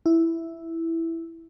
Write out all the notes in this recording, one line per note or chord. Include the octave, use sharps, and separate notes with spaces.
E4